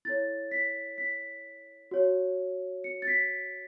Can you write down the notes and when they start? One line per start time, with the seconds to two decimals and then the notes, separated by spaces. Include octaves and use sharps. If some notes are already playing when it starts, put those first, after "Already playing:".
0.05 E4 A4 C#5 A6
0.51 B6
0.98 B6
1.91 F#4 C#5
2.84 C#7
3.02 A6
3.07 B6